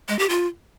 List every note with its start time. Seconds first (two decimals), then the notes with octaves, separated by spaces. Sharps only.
0.09 G#3
0.19 G4
0.29 F4